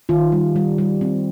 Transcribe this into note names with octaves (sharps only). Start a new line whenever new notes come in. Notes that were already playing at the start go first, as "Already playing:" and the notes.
D#3 F4
G3
G3
G3
C4